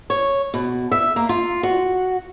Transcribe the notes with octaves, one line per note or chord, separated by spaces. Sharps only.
C#5
B2
E5
A#3
F4
F#4